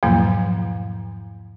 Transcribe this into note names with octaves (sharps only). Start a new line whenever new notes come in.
E2 G#2 B2 F3 F#3 A#3